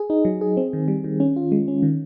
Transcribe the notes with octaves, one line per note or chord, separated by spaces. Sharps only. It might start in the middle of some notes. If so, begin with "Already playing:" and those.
Already playing: G#4
D#4
F#3
G#4
C4
D#3
G3
D#3
C#4
F4
G#3
C#4
D#3